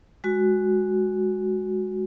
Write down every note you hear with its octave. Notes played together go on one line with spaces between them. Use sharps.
G#3 F#4